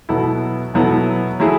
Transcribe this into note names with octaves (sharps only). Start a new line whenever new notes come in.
B2 F#3 B3 E4 A4
B2 F#3 B3 E4 A4
F#3 A3 E4 G#4